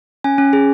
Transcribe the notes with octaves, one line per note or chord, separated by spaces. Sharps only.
C#4 G#5
C#4
G#4